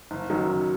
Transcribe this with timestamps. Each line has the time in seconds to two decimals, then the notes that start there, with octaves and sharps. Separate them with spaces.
0.11 F#1
0.30 F#2 D#3 F#3
0.48 F#1